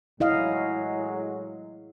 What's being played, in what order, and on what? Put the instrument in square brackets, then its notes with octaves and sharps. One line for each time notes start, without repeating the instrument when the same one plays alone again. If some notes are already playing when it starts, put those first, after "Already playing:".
[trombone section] A2 F#3 G#3 [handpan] E4 D#5 F5